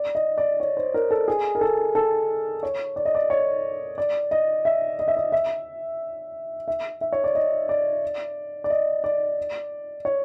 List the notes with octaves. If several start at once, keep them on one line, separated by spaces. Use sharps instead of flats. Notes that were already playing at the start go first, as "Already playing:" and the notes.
Already playing: D5
D#5
D5
C#5
C5
A#4
A4
G#4
A#4
A4
A4
C#5
D5
D#5
D5
C#5
D5
D#5
E5
D#5
E5
D#5
E5
E5
E5
C#5
D5
D#5
D5
D5
D#5
D5
C#5